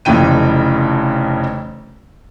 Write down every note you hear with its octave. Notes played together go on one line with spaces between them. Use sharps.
F1 F2 C#3 E3 G5 D#7